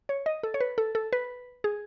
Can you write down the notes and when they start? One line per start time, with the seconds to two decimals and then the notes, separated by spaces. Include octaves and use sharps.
0.09 C#5
0.26 D#5
0.43 A4
0.54 C#5
0.61 B4
0.78 A4
0.95 A4
1.13 B4
1.64 G#4